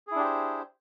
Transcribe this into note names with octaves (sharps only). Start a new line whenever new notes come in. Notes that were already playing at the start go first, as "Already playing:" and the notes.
D4 E4 G4 G#4 C5